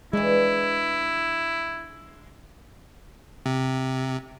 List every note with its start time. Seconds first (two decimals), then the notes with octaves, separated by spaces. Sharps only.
0.13 E3 G#3 D4 E4
3.46 C3